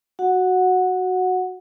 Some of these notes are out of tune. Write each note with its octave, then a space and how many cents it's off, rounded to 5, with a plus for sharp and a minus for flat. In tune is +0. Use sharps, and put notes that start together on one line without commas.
F#4 +0 F#5 -10